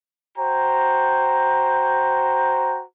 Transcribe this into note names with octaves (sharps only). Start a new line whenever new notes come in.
F#4 C5 G5 A#5